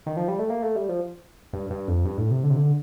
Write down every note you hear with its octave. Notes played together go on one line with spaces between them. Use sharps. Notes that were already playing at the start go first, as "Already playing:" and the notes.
D#3
F3
G3
A3
A#3
A3
G3
F3
G2
G2
F2
G2
A2
C3
D3
C3
D3